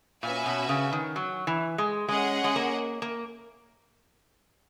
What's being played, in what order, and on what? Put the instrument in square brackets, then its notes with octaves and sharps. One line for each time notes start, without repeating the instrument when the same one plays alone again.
[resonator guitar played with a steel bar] A#2 [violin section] C#4 F#4 B4 E5 G#5
[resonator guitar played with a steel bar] B2
C#3
D#3
F#3
E3
G#3
[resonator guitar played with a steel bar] G#3 [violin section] C#4 G#4 D#5 F#5
[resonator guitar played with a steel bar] G#3
A#3
A#3